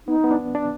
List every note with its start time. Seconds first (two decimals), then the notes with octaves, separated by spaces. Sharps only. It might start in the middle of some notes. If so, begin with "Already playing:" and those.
0.07 B3 D#4
0.24 B3
0.31 D4
0.55 D4